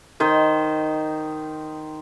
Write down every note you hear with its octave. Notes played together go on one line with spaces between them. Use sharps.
D#3 C5 D#5